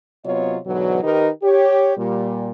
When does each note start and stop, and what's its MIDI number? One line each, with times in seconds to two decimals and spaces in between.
0.24 0.57 48
0.24 0.57 54
0.24 0.57 59
0.24 0.57 65
0.24 0.57 73
0.24 0.57 75
0.65 1.00 44
0.65 1.00 47
0.65 1.00 50
0.65 1.00 52
0.65 1.00 54
1.02 1.29 51
1.02 1.29 63
1.02 1.29 67
1.02 1.29 70
1.02 1.29 71
1.02 1.29 75
1.43 1.92 67
1.43 1.92 73
1.97 2.51 46
1.97 2.51 55